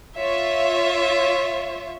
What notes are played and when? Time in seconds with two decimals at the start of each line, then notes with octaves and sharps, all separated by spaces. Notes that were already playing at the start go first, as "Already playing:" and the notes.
0.18 F4 C#5 E5